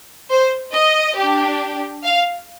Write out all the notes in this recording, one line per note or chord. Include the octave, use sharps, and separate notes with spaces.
C5
D#5
D4 G4
F5